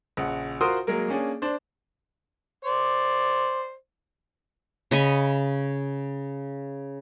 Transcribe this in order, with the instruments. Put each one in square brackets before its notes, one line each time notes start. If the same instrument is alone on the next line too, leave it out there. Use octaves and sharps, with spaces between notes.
[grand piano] A#1 C#3 F#5
F4 F#4 A#4 C5 C6 D#6
F#3 G#3 A#3 A#4
A#3 C#4 D4 G#4
D4 C5
[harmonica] C5 D5
[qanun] C#3 D#5 B5 C#6